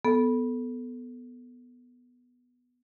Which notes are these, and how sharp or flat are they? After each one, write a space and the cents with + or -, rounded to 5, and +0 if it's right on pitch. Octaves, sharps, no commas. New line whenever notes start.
B3 +0 A4 -5